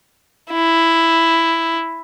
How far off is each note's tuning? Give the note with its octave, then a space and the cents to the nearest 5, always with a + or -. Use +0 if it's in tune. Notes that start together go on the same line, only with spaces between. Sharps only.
E4 +5